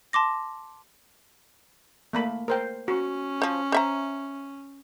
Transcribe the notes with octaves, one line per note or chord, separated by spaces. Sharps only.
A5 C6 D6 A#6
A3 A#3 B5
A#4 C5 G5
C#4 F#4
F3 C5
C5 E5 A#5